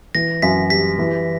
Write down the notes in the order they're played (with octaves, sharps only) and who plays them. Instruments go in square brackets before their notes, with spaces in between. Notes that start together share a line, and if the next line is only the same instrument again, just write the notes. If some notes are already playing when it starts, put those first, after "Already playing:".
[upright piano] E3 [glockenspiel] A#6
[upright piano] F#2 [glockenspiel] B6
[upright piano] G3 [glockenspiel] B6
[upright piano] E3